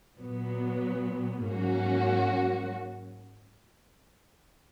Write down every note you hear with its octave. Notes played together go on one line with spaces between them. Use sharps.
A#2 F#3 B3
G#2 F#3 A#3 C#4 F#4